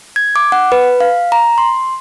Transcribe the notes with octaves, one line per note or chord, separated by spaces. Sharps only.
G#6
D6
F#5
B4
F5
A#5
C6